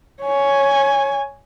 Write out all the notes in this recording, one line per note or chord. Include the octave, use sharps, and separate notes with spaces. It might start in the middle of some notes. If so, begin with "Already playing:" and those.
C#5 G#5